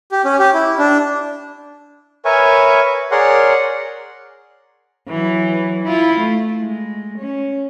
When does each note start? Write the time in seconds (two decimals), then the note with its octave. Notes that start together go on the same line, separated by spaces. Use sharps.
0.12 G4
0.25 C#4
0.39 G4
0.54 E4
0.78 D4
2.25 A#4 B4 C#5 E5 G#5 C#6
3.11 G#4 A#4 C#5 D5 F#5 C6
5.08 E3 F#3
5.84 E4 F4
6.20 A3
6.61 G#3
7.18 C#4